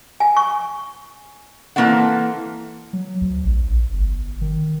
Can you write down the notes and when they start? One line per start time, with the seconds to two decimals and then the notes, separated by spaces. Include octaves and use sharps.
0.20 G#5
0.37 C#6
1.76 E3 A#3 C4 A4 F#5
2.93 F#3
3.21 D2
3.45 A#1
3.70 A#1
3.93 G1
4.41 D#3